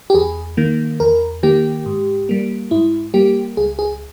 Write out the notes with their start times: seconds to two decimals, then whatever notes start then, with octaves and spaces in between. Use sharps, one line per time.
0.10 G4
0.14 E2 G#4
0.57 D#3 A#3
1.00 E2 A#4
1.43 D#3 A#3 G4
1.86 G#2
2.29 G3 A#3
2.71 G#2 E4
3.14 G3 A#3 G4
3.57 C#2 G#4
3.79 G#4